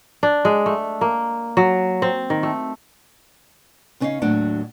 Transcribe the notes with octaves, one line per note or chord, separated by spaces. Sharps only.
D4
G#3
A3
A#3
F#3
C4
D#3
A3
C#3 B3 C#4 D#4 D#5 F5
D#2 A2 F#3 D4 F#4 F#5